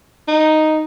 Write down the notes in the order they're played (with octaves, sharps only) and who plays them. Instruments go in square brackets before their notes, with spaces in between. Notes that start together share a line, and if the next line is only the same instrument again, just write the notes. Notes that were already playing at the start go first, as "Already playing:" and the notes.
[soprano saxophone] D#4